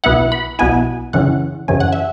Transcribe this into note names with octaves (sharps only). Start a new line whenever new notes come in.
B1 B2 B3 E4 F#5
B5
B1 B2 B3 E4 G#5
F#2 C#3 E3 C#4 F#5
F#2 C#3 E3 C#4 G#5
F#5
E5